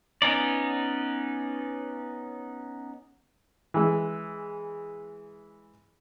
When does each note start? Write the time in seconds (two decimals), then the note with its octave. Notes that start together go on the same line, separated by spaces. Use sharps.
0.22 B3 C#4 D#4 D5
3.74 E3 G#3